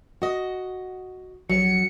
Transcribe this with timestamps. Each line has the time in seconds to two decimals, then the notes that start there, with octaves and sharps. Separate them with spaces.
0.22 F#4 D#5
1.50 A#1 F#3 C#7